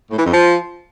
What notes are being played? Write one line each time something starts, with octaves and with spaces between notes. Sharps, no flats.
A2
E3
F2
F3